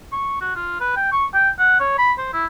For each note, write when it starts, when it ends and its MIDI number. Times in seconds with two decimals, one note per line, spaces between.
0.12 0.40 85
0.41 0.55 66
0.56 0.80 65
0.80 0.94 71
0.96 1.09 79
1.12 1.26 85
1.34 1.49 79
1.58 1.77 78
1.80 1.93 73
1.98 2.12 83
2.18 2.29 72
2.33 2.46 64